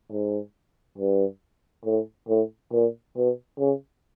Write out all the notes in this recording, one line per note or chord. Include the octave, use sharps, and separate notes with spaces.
G#2
G2
A2
A2
A#2
B2
C#3